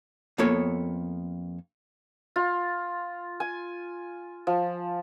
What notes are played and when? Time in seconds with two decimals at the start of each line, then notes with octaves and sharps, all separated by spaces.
0.38 F2 A#3 B3 A4 C#5
2.36 F4
3.40 G#5
4.47 F3